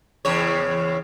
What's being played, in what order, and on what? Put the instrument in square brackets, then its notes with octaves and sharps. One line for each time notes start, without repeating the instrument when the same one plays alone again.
[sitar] E2 C#3 C#5